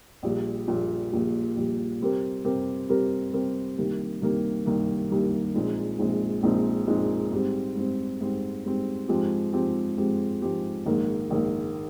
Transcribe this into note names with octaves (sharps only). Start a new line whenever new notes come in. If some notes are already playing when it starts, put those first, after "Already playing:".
A#1 A#2 G3
A#1 A#2 G3
A#1 A#2 G3
A#1 A#2 G3
C3 G3 C4 G4 A#4
C3 G3 C4 G4 A#4
C3 G3 C4 G4 A#4
C3 G3 C4 G4 A#4
C2 C3 D#3 A#3
C2 C3 D#3 A#3
C2 C3 D#3 A#3
C2 C3 D#3 A#3
A#1 A#2 G#3 C4 D#4
A#1 A#2 G#3 C4 D#4
A#1 A#2 G#3 C4 D#4
A#1 A#2 G#3 C4 D#4
G#2 G3 C4
G#2 G3 C4
G#2 G3 C4
G#2 G3 C4
G#2 F3 G#3 C4 G4
G#2 F3 G#3 C4 G4
G#2 F3 G#3 C4 G4
G#2 F3 G#3 C4 G4
A#1 G#2 D#3 A#3
A#1 G#2 D#3 A#3